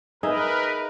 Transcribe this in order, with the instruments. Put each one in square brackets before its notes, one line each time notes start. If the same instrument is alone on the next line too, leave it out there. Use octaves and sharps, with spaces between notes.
[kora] D#4 [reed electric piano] G#4 D#5 E5 [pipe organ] A#4 B4